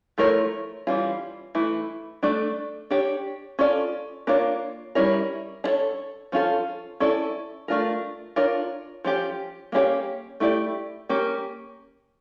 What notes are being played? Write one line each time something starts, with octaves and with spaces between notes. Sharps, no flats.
F3 A3 E4 A#4 C#5
E3 G3 C#4 F4
E3 A3 E4
A3 D4 A4 D5
D4 G4 C#5
C#4 F4 A4 D5
A#3 D4 F4 C#5
G3 C#4 E4 A#4 C#5
D4 A4 C#5
F3 C#4 F4 A4
C#4 E4 A4 D5
A3 D4 F4 A#4
D4 F4 A#4 C#5
F3 C#4 G4
A#3 C#4 E4 G4 C#5
A3 E4 G4 D5
A#3 C#4 G4